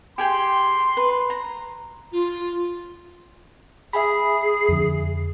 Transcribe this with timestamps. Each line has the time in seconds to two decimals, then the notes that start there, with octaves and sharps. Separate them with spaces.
0.18 G4 G#4 G5 C6
0.97 B4
1.30 A#5
2.13 F4
3.93 G#4 E5 G#5 B5
4.69 F2 D3